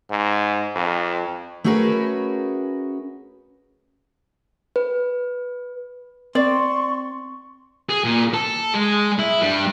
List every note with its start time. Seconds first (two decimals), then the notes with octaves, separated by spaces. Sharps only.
0.10 G#2
0.76 F2
1.64 A3 C#4 F#4 G#4 A#4 B4
4.76 B4
6.35 C4 D5 C6 C#6
7.90 G#4
8.04 A#2
8.34 A4 A5
8.74 G#3
9.19 E4
9.42 G2 G3